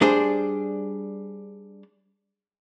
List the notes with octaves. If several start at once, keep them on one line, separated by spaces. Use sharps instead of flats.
G3 D4 G#4 C5